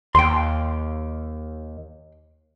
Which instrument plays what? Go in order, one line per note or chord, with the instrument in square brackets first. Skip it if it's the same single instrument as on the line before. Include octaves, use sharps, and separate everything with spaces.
[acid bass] D#2 [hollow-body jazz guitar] G5 C6